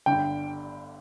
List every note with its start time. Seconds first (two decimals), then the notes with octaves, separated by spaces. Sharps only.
0.06 G1 G2 D3 G5